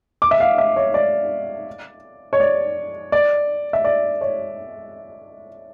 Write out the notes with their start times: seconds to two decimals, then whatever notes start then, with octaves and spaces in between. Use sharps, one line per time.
0.22 D6
0.31 E5
0.40 F5
0.58 E5
0.76 C#5
0.94 D5
2.33 C#5
2.40 D5
3.12 D5
3.73 E5
3.85 D5
4.21 C#5